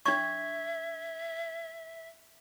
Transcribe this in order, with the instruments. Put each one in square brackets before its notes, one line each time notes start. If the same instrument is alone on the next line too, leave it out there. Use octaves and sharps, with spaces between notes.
[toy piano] D4 C#6 [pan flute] E5 [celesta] G#6